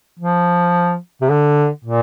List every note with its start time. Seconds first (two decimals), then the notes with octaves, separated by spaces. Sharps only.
0.19 F3
1.21 C3
1.30 D3
1.85 A#2